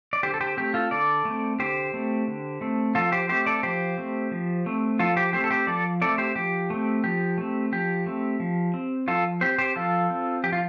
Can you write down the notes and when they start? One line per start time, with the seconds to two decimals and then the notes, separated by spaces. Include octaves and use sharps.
0.13 D5
0.23 D3 G4 C5
0.34 A4
0.41 G4 C5
0.57 A3 C4 G4
0.74 F4 A4
0.91 D3 A4 D5
1.25 A3 C4
1.59 D3 G4 C5
1.94 A3 C4
2.28 D3
2.61 A3 C4
2.95 F3 F4 A4
3.12 G4 C5
3.29 A3 C4 G4 C5
3.46 A4 D5
3.63 F3 G4 C5
3.98 A3 C4
4.31 F3
4.66 A3 C4
4.99 F3 F4 A4
5.17 G4 C5
5.33 A3 C4 G4 C5
5.44 A4
5.51 G4 C5
5.67 F3 A4 D5
6.02 A3 C4 A4 D5
6.18 G4 C5
6.36 F3 G4
6.70 A3 C4
7.04 F3 G4
7.38 A3 C4
7.72 F3 G4
8.06 A3 C4
8.40 F3
8.74 C4
9.08 F3 F4 A4
9.41 C4 G4 C5
9.58 G4 C5
9.76 F3 F4 A4
10.10 C4
10.44 F3 G4
10.53 F4